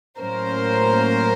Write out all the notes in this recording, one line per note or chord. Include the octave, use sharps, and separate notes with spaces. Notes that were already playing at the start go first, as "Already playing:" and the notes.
A2 F#3 A#3 C#4 A#4 C5